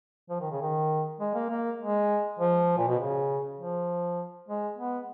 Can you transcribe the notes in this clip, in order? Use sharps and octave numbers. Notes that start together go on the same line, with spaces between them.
F3
D#3
C#3
D#3
G#3
A#3
A#3
G#3
F3
A#2
B2
C#3
F3
G#3
B3